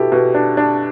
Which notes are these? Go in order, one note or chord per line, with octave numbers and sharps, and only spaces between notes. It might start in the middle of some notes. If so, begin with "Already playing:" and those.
Already playing: B2 E4 G4 A4
B2
D4
D4